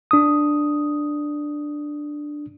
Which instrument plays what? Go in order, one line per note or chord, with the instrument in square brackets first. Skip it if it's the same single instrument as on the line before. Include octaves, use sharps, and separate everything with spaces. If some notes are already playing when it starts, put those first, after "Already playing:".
[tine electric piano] D4 D#6